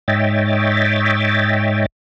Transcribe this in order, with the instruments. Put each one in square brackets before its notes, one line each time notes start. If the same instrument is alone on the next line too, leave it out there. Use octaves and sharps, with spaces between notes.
[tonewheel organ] G#2 C#5 D#5 E5 G5 A6